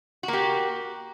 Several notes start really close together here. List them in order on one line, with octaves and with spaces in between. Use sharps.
F#4 A#3 G4